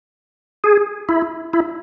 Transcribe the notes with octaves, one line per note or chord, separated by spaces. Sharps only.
G#4
E4
E4